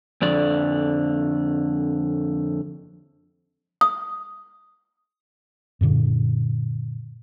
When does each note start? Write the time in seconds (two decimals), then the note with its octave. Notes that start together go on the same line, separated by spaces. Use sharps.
0.22 F2 D3 D5
3.81 D#6
5.81 F#2 A#2 D3